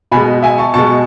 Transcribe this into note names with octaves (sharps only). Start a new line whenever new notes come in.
B2 G#5 B5
G#3
E5 G#5
A5 C#6
B2 G#3 A5 C#6